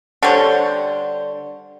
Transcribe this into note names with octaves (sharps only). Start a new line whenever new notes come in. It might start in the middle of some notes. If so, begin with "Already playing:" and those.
D3 G3 C5 C#5